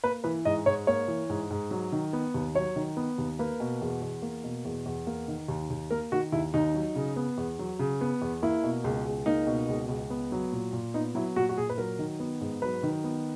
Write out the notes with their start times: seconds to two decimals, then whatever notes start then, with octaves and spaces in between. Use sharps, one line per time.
0.04 A#3 B4
0.24 E3 B4
0.45 G#2 D#5
0.66 G#2 C#5
0.87 A#3 C#5
1.08 E3
1.29 G#2
1.50 G#2
1.71 F#3
1.92 D#3
2.13 B3
2.34 D#2
2.55 F#3 C#5
2.76 D#3
2.97 B3
3.18 D#2
3.39 A#3 B4
3.60 B2
3.81 E2
4.02 E2
4.22 A#3
4.44 B2
4.65 E2
4.86 E2
5.07 A#3
5.28 D#3
5.48 D#2
5.70 D#2
5.91 A#3 A#4
6.12 D#3 F#4
6.32 D#2 E4
6.54 D#2 D#4
6.74 F#3
6.96 C#3
7.16 B3
7.38 E2
7.59 F#3
7.79 C#3
8.01 B3
8.22 E2
8.43 A#3 E4
8.63 B2
8.84 C#2
9.06 C#2
9.26 A#3 D#4
9.47 B2
9.68 C#2
9.89 C#2
10.10 B3
10.32 F#3
10.52 A#2
10.73 A#2
10.94 B3 D#4
11.15 F#3 E4
11.36 A#2 F#4
11.49 F#4
11.57 A#2 G#4
11.70 B4
11.78 F#3 A#4
11.99 D#3
12.20 B3
12.41 G#2
12.62 F#3 B4
12.83 D#3
13.04 B3